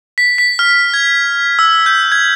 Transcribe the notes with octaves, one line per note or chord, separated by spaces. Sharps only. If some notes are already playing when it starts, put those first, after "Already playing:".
B6
B6
F6
G#6
E6
G6
G#6